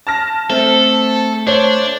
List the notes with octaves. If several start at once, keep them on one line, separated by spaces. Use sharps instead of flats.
A5 F6 A#6
A3 C4 A4
D4 C5 C#5